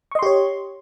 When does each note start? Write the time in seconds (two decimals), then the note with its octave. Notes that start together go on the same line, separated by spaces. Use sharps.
0.11 C#6
0.15 D#5
0.19 C6
0.23 G4
0.26 C#5